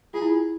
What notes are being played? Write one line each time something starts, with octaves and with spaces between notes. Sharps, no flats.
F4 G#4
E4
F4